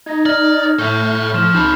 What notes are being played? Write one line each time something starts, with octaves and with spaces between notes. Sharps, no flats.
D#4 G#6 A#6
D5 F6
A2 A4 C#5 C#6 G6
F3 C6 F6 E7
C#2 D#4 A5 B5 G6